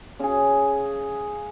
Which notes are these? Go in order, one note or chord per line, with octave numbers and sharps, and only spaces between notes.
C#3 G#4